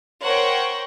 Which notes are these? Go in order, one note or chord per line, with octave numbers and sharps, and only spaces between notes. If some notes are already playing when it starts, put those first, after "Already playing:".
A#4 C5 C#5 F#5 G5 C#6